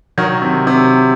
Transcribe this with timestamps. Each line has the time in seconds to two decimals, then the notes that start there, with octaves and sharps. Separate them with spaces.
0.18 D#3 F#3
0.42 C3
0.67 C3